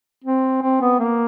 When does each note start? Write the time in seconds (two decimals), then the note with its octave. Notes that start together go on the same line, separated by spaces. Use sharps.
0.24 C4
0.62 C4
0.81 B3
0.99 A#3